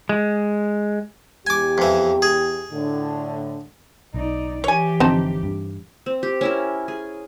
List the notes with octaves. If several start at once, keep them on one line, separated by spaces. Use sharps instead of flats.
G#3
E2 G4 G#5 D6
F2 E3
G#4
A2 D3
B1 D#4 D5
E3 G4 C#5 G#5
G#1 D3 F3 C4 D#4 A5
G2
C4
G4
C#4 E4 A#4
G#4